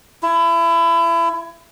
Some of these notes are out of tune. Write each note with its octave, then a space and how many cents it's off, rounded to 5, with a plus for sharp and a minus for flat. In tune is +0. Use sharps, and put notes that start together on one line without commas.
E4 +30